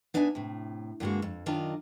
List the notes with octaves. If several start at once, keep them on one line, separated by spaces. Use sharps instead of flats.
B3 D4 D#4 E5 F5 G#5
A2 C3
G2 D3 G3 G#3 A#3 F#4
F2
F#2 D#3 D4 F4 D#5 A#5